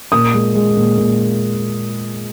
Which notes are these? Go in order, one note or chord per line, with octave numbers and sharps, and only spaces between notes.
A#2 D#6
G#3
G#3
A#2
A#2